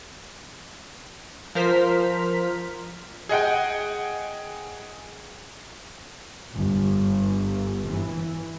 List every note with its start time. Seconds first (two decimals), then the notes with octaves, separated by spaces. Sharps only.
1.55 F3 A#4 C5 F6 B6
3.29 G#4 D#5 F#5 G5
6.53 G1
7.87 E3